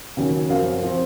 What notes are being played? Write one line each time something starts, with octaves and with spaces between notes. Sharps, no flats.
D#2 C#3 F#3 C#4
F#2 F3 C4 F5
F3 C4